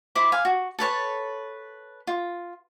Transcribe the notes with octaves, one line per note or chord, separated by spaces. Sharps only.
E4 C5 B5 D6
F5 G#5
F#4
A4 B4 C#5 A5
F4